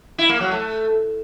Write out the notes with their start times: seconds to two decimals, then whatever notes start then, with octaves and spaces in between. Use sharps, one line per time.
0.18 E4
0.29 A#3
0.40 F#3
0.51 A3